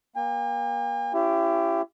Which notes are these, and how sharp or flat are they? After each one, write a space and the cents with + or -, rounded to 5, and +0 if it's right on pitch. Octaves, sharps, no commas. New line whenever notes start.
A#3 +35 G#5 -45
C#4 +0 E4 +35 G4 +0